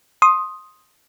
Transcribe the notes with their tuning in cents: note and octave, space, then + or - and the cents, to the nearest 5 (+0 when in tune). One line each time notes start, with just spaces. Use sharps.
C6 +15 D#6 +0